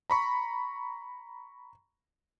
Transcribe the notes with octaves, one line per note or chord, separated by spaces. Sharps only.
A#5 B5 C#6